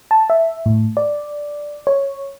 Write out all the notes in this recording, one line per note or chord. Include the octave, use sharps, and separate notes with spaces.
A5
E5
A2
D5
C#5